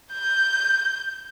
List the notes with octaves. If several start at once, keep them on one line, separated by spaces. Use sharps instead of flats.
G6